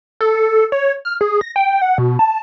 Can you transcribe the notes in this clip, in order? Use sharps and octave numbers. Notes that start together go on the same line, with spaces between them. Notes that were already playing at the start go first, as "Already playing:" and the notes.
A4
C#5
F6
G#4
A#6
G5
F#5
B2
A5